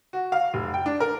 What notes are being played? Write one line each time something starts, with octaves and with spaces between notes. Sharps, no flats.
F#4
F5
F1
G5
D4
A#4